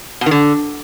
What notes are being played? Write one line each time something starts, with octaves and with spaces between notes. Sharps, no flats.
B2
D#3
D3